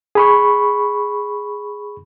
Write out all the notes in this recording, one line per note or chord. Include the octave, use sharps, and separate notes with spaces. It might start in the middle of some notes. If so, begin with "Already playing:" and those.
G#4 B5 C#6